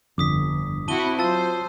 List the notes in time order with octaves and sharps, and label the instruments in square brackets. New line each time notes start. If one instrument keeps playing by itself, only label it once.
[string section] G1 [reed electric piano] F2 D3 [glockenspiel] D6 D#6 B6
[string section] C4 E4 F#4 [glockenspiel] A5 D#7 G7
[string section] F#3 C5 [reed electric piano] F4 [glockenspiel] A5 E6 A6